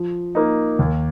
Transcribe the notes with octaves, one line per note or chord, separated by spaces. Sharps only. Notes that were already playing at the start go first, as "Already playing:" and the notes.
Already playing: F3
A#3 D#4
D#2